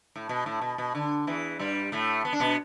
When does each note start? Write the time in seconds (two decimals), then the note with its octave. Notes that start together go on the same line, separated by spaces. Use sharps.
0.16 A2
0.29 B2
0.46 A2
0.61 B2
0.78 B2
0.95 D3
1.27 E2 E3
1.59 G2 G3
1.92 A2 A3
2.25 B3
2.33 D4
2.40 B2 B3